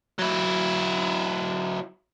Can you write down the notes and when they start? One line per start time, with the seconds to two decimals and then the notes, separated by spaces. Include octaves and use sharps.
0.19 F#3 E4